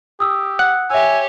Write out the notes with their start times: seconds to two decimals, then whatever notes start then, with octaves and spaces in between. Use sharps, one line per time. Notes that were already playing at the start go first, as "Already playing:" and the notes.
0.20 G4 D#6 E6
0.59 F#5
0.90 G4 C#5 E5 G#5 E6